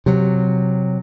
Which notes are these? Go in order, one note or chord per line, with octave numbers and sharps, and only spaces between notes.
C3 F#3